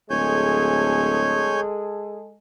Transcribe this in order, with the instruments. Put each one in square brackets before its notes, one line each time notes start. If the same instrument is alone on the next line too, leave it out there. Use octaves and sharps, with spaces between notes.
[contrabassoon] D1 [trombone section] G#3 G#4 A4 [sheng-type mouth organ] C#5 G#5 G6